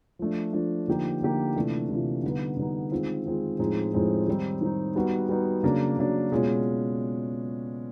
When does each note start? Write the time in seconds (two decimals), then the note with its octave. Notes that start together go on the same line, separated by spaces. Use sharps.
0.19 F3 A3 D4
0.53 F3 A3 D4
0.88 D3 F3 A#3 D#4 G4
1.22 D3 F3 A#3 D#4 G4
1.56 C3 E3 A3 D4 F4
1.89 C3 E3 A3 D4 F4
2.23 D3 G3 B3 D#4
2.57 D3 G3 B3 D#4
2.91 D#3 G#3 C4 F4
3.26 D#3 G#3 C4 F4
3.59 A2 F3 G#3 C4 D#4
3.94 A2 F3 G#3 C4 D#4
4.27 D#3 G3 C4 D#4
4.61 D#3 G3 C4 D#4
4.95 G3 B3 D#4 F#4
5.29 G3 B3 D#4 F#4
5.63 C#3 F#3 A#3 D4
5.98 C#3 F#3 A#3 D4
6.32 B2 G#3 C#4 F4